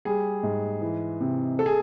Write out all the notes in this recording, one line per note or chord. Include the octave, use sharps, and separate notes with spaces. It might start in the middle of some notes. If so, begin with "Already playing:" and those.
G3 G#4
G#2
E3
C3
A4
G#4